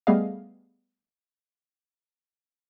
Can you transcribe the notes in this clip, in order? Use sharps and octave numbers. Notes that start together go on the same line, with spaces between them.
G3 A3 B3 G#4 D#5 F5